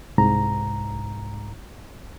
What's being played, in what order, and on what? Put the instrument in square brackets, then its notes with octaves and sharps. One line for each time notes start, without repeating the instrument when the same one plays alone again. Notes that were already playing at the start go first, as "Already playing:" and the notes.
[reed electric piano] C2 G#2 A#5